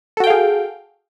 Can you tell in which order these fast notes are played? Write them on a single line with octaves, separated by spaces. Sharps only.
A4 F#4 G5 F5 G#4